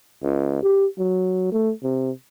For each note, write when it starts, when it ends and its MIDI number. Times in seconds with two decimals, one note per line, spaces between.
0.23 0.61 37
0.62 0.86 67
0.98 1.49 54
1.52 1.72 57
1.83 2.11 48